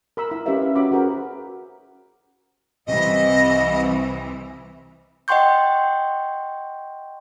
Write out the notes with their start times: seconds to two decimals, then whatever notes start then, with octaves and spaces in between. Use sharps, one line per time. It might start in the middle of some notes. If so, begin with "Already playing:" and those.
0.17 A#4 B5 E6
0.30 E4 B5
0.46 C#4 G4 A#4 B4 E5 F5
0.62 B4
0.75 C#4 F#4 B5 D6
0.91 F#4 G#4 A#4 C5
2.87 C2 E3 D#5
5.28 D#5 F#5 G5 C6 C#6 G6